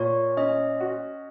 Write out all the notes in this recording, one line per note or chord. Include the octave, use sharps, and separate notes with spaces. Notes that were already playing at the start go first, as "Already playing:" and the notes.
Already playing: A#2 C#5
C#4 D#5
F#4